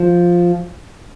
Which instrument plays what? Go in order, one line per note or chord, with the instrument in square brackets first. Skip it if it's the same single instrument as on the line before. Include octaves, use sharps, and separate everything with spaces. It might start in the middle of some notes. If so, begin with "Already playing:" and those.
Already playing: [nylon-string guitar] F3